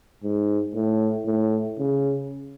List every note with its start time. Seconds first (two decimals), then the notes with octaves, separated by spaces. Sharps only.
0.23 G#2
0.75 A2
1.26 A2
1.79 C#3